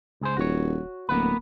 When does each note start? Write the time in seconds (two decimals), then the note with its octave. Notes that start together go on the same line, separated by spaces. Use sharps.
0.21 C#2 G#4 C5
0.37 D#1 F#4 C#5
1.09 D1 A#3 B3 B4